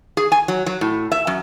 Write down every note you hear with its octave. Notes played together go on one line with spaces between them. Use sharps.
G#4
G#5
F#3
F#3
A2
E5
F#2